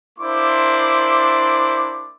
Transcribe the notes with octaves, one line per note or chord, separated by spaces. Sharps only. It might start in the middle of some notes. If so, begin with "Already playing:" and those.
A#3 D4 E4 C5 C6 D6